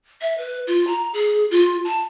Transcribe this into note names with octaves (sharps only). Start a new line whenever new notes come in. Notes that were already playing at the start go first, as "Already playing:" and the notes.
E5
B4
F4
A#5
G#4
F4
A5